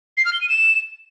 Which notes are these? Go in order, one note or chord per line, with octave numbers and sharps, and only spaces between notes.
C7
F6
G7
D#7
E7